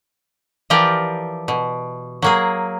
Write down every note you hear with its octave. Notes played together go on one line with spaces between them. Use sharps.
E3 F3 F4 G4 A#4 D5
B2
F#3 A#3 G#4